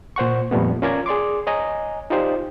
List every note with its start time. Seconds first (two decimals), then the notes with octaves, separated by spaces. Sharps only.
0.16 A#2 C5 F#5 C#6
0.51 F2 A#2 G3 A3 B3
0.82 C#4 F4 A#4 D5 A#5 G#6
1.06 G#4 D5 C6 D6
1.47 C#5 D#5 G#5 A#5
2.10 D#4 F4 G4 C5 D5